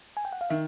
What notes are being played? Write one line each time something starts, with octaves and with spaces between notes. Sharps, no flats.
G#5
G5
F#5
F5
D#3 E5